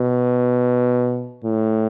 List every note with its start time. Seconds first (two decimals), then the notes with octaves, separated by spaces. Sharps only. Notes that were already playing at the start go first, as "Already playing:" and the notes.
Already playing: B2
1.45 A2